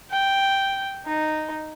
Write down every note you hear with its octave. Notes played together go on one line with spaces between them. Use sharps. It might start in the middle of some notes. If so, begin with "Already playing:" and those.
G5
D#4